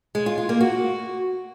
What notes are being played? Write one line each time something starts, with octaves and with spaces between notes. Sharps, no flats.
G#3
F4
F4
A#3
F#4